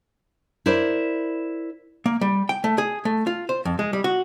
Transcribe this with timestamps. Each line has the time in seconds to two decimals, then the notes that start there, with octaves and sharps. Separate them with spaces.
0.66 E4 A#4 C5 D5
2.06 A#3
2.21 G3
2.49 G5
2.64 A3
2.78 G#4
3.05 A3
3.27 F4
3.49 C5
3.65 F2
3.79 G#3
3.93 G3
4.04 F#4